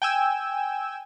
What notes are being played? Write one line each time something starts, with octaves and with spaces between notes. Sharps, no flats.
G5 G#5 E6